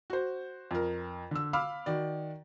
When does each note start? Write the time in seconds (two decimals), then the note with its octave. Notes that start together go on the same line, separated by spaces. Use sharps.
0.10 F#4 C5
0.71 F2 A#4
1.31 D3 E6
1.53 F5 B5 D6 E6 F6
1.86 D#3 F#4 D5